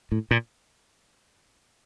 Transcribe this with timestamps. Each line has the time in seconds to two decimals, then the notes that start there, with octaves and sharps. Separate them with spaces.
0.12 A2
0.31 A#2